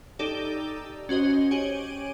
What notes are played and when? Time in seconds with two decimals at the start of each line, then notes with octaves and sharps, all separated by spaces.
0.19 D#4 G4 A4 D5
1.09 C#4 F#4 C5 D#5
1.51 G4 C#5 G#5 D7 D#7 F#7